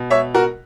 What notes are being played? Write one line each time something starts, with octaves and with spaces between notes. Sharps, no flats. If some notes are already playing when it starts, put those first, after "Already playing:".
Already playing: B2
C#5 E5
F#4 A#4